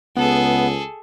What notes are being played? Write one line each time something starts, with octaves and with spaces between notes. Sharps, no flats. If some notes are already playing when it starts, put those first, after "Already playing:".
C#2 B3 G#4 A4